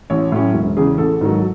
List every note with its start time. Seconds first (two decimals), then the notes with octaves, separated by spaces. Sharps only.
0.10 A1 C#5
0.32 A2 F#3 C#4
0.54 E1
0.77 E2 C#3 G#4
0.98 A1 A4
1.21 G#2 D#3 F#3